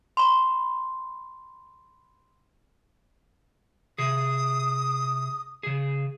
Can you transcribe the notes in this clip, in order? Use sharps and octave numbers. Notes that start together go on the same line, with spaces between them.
B5 C6
C3 G#4 D#6
C#3 G#4